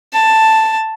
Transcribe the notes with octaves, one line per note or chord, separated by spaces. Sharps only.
A5